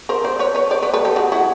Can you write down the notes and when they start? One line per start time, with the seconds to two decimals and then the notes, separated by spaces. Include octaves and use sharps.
0.09 A#4 C5
0.24 C5 D5
0.39 B4 C#5
0.55 B4 C#5
0.71 C5 D5
0.82 B4 C#5
0.94 A4 B4
1.05 G4 A4
1.16 F#4 G#4
1.32 E4 F#4